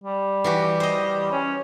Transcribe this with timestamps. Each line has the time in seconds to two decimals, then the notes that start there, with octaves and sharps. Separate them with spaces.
0.04 G3
0.44 E3 F#4 G4
0.80 C5 D#5
1.31 C#4